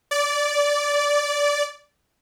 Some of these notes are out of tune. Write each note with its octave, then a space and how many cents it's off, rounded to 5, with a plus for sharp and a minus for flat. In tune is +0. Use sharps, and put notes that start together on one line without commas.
D5 -15